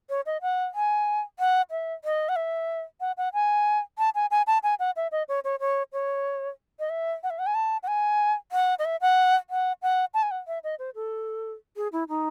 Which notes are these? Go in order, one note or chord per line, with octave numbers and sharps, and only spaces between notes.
C#5
D#5
F#5
G#5
F#5
E5
D#5
F#5
E5
F#5
F#5
G#5
A5
G#5
G#5
A5
G#5
F#5
E5
D#5
C#5
C#5
C#5
C#5
D#5
E5
F#5
E5
F#5
G#5
A5
F#5
G#5
F#5
D#5
E5
F#5
F#5
F#5
A5
G#5
F#5
E5
D#5
C5
A4
G#4
E4
D#4